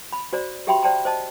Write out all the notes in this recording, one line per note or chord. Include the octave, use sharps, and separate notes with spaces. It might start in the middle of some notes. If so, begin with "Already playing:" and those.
B5
F#4 C5 D5 A#5
F#4 G4 E5 G5 B5 C6
C5 D5 G5 A5 A#5 C6
C5 D#5 A5